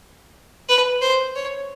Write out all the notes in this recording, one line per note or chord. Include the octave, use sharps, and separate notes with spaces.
B4
C5
C#5